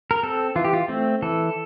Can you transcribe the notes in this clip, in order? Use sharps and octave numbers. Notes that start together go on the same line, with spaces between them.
A#4
C4 A4
E3 F4
G4
F4
A3 C4
E3 A4